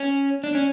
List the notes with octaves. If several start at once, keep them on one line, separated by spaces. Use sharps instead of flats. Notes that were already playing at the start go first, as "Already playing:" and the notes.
Already playing: C#4
D4
C#4